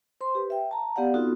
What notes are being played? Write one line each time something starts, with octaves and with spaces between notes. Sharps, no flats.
C5 C6
G4 B4
E5 G5
A5 A#5
B3 G4 D5 F5 F#5
B3 C4 D#4 F4 F#4 A4